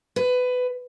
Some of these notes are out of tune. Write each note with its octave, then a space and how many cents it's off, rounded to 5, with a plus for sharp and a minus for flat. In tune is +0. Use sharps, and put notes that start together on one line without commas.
B4 +20